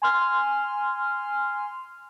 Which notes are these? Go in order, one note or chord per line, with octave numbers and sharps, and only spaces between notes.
G#5 C6 F6